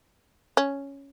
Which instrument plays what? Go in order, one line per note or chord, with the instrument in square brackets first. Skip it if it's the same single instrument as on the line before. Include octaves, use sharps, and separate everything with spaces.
[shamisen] C#4